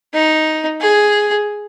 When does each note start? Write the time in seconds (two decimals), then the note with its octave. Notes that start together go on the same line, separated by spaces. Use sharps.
0.14 D#4
0.81 G#4